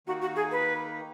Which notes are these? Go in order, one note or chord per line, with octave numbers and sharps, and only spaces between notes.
D#3 A#3 D#4 F#4
F#4
G#4
B4